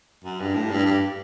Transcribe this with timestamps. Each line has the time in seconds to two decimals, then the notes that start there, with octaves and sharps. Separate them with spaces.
0.24 F#2
0.40 G2
0.55 A2
0.70 G2
0.86 G2